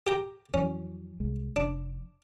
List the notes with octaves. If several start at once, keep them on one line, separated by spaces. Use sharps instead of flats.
G4 G5 A#5
F2 E3 F#3 C#4
C2 G#3
F1 D4